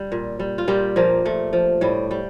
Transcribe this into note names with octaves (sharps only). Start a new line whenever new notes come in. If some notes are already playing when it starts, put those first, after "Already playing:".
Already playing: G3
A#2
G3
F4
A#2 G3 G4
A#2 F3 A#3
A#2 A3
F3
A2 G3
G3